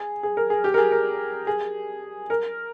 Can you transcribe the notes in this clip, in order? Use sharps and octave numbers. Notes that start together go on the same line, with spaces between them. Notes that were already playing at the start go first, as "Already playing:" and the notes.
Already playing: G#4
G#4
A#4
G#4
G4
A#4
G#4
A#4
G#4
A#4